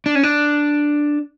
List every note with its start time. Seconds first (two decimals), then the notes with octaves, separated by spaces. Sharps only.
0.06 D4
0.15 C#4
0.23 D4